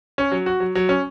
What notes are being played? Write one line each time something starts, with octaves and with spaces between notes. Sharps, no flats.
C#4
F#3
F#4
F#3
F#3
C#4